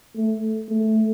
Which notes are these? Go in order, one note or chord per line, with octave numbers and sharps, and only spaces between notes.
A3
A3